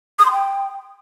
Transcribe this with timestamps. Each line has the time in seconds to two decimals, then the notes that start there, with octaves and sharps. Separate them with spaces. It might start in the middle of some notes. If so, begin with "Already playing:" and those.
0.19 D#6
0.25 C6
0.32 G5